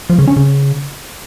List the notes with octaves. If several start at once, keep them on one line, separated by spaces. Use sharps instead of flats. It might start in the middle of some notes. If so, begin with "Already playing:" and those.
F3
C#3
C#4
C#3